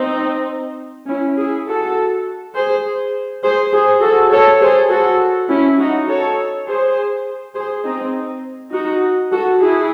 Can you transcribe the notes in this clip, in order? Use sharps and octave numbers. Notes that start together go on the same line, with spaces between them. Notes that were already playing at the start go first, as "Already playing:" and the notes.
Already playing: C4 D#4
C#4 E4
E4 G#4
F#4 A4
G#4 C5
G#4 C5
G#4 C5
F#4 A4
A4 C#5
G#4 C5
F#4 A4
C#4 E4
D#4 F#4
A4 C#5
G#4 C5
G#4 C5
C4 D#4
D#4 F#4
F#4 A4
E4 G#4